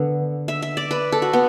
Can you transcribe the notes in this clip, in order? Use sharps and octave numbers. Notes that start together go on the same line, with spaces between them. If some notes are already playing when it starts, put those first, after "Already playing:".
Already playing: D3 B3
E5
E5
D5
B4
A4
F#4
B3